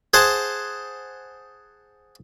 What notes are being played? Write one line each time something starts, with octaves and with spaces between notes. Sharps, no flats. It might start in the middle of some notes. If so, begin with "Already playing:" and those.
G#4 C5 F#5 A5